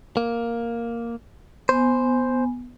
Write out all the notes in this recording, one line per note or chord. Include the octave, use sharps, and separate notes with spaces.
A#3
B3 C5 G#5